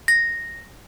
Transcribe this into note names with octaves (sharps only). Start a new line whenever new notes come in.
A#6